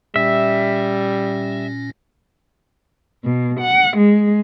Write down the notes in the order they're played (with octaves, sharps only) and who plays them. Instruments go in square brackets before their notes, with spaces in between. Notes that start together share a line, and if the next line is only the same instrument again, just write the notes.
[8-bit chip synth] A#2 C#4 A#6 [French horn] G3 [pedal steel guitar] E5
[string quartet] B2
F#5
G#3